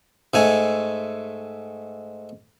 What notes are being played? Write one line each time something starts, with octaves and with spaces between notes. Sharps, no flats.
G#2 A3 G#5